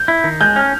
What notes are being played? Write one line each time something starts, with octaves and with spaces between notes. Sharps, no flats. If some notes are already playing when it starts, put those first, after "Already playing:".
Already playing: G6
E4
D#3
G#3 G6
C#4 F6